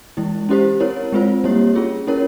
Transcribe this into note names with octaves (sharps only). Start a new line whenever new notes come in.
E3 G#3 E4
C#4 E4 G4 C5
C4 E4 A#4 C#5
G#3 C4 F4 C5
G3 A#3 E4 G4 C#5
C#4 F4 G#4
C#4 E4 A#4 C#5